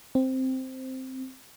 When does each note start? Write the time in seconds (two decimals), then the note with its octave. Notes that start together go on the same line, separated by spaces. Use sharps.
0.15 C4